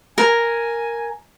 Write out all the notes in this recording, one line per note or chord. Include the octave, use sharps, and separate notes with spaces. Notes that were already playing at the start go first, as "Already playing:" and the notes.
A#4 G#5